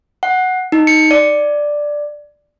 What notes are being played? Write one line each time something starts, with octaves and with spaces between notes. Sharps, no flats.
F#5
D#4
C#7
D5